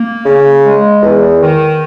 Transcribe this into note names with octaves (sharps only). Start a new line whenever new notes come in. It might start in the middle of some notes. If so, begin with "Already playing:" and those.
Already playing: A#3
C#3
G#3
E2
D#3